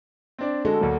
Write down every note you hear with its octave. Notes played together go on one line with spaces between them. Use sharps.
C4 D4 D5
D3 G#3 F#4 A4
D2 F#3 A#3